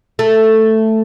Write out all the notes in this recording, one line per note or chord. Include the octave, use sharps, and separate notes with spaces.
A3